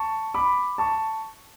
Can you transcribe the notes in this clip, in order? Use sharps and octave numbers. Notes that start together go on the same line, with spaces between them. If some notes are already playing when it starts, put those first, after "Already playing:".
Already playing: A5 C#6
B5 D6
A5 C#6